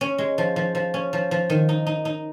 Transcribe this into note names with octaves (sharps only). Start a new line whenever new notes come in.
C#4
G#3
F3
F3
F3
C#4
F3
F3
D#3
D#4
D#4
D#4